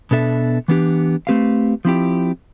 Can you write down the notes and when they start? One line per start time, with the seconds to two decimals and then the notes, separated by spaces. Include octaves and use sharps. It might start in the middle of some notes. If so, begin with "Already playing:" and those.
0.11 B2 B3 D4 A4 E5
0.68 E3 B3 D4 G4
1.27 A3 C4 G4 B4 F5
1.85 F3 C4 E4 G4